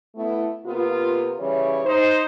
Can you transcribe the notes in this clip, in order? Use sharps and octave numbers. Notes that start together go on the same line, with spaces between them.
A3 B3 E4
C3 A#3 B3 F4
C#3 E3 G3 C#5
D#4 C5